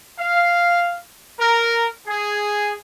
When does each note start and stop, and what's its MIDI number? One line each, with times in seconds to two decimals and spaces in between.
0.19 0.96 77
1.39 1.86 70
2.07 2.73 68